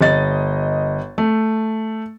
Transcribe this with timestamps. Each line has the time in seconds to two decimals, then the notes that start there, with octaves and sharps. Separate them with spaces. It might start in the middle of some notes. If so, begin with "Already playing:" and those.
0.01 G1 D#5 A6
1.18 A3